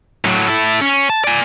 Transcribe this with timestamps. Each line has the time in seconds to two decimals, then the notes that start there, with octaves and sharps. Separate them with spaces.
0.25 A2 F#3
0.48 E4 A4
0.81 C#4
1.10 A5
1.24 D5 G#5